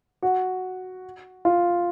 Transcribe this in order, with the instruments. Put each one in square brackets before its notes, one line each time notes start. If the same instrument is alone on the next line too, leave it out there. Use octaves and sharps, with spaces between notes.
[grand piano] F#4
F4